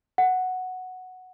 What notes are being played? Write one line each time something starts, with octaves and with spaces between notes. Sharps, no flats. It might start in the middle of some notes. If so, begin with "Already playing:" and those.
F#5